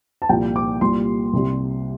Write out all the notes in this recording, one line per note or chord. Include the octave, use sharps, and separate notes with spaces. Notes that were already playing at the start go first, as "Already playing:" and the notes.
A5
C2 A#2 F3 G5
D6
C2 A#2 G3 C6
C2 C3 G3